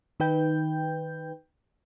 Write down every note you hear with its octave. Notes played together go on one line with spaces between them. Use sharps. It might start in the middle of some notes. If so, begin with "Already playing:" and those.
D#3 D#4 B4 G5 G6